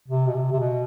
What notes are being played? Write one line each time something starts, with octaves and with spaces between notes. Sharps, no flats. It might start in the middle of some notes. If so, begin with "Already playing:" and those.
C3
B2
C3
C3
B2